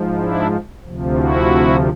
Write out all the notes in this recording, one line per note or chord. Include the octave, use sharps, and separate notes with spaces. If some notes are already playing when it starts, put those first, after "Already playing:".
Already playing: G#2 F3
D4 E4
D2 C3 F3
E4 F#4